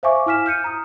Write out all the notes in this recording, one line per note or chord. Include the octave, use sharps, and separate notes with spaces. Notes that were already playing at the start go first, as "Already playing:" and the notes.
C5 E5 F5 G#5 C#6 D6
E4 G#5 F6 B6 E7
F6 G6 C#7 D#7
A#5 D#6